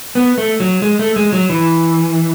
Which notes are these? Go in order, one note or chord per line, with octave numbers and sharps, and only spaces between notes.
B3
A3
F#3
G#3
A3
G#3
F#3
E3